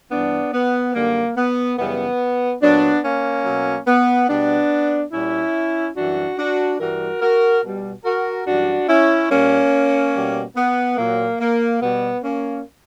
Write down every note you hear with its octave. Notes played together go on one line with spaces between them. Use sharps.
G2 E3 G3 B3 D4
B3
F#2 D3 G3 A#3
B3
F#2 C#3 E3 G3 B3
A#2 F#3 B3 D4
A#3 C#4
B2 F#3
B3
B2 G3 B3 D4
A#2 G3 C#4 E4
F#2 E3 G3 D4 F#4
D4 F#4
G2 E3 G3 F#4 A#4
F#4 A#4
B2 G3
F#4 A#4
F#2 E3 G3 D4 F#4
C#4 E4
A#2 G3 A#3 C#4
B2 G3
B3
A#2 F#3 A#3
A#3
B2 G3 B3
A#3 C#4